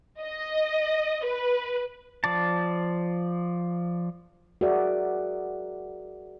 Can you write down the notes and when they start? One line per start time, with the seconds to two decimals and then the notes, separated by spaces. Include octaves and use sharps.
0.21 D#5
1.26 B4
2.24 F3 D5 A5
4.61 F#4 G#4 A#4 D5 E5